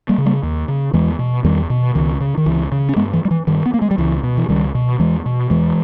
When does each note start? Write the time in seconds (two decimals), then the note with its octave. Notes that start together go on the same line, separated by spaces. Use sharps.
0.09 G3 A#3
0.18 C#3
0.26 G3 A#3
0.43 D#2
0.68 C#3
0.93 E2 E3 G#3
1.19 B2
1.44 E2 D#3 G3
1.70 B2
1.95 C#2 D#3
2.20 C#3
2.37 D#3
2.46 C#2 E3
2.72 C#3
2.89 C#4
2.96 G2 G#3 B3
3.13 E3
3.25 G3
3.31 E3
3.47 G2 D#3
3.66 B3
3.74 A#3
3.82 G#3
3.91 G3
3.98 C#2 E3
4.23 B2
4.37 E3
4.49 C#2 D#3 G3
4.75 B2
4.99 E2 E3 G#3
5.26 B2
5.50 E2 E3 G#3